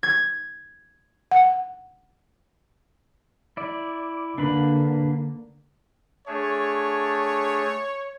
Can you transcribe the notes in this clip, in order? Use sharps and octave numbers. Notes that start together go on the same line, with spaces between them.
G#6
F#5
E4 D5
D3 A#3 D4 B4 B5
A3 D4 G#4 C#5